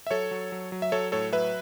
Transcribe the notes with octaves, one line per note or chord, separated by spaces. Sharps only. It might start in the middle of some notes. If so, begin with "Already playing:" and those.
E5
F#3 A4 C#5
F#3
F#3
F#3
E5
F#3 A4 C#5
A2 A4 C#5
F#3 B4 E5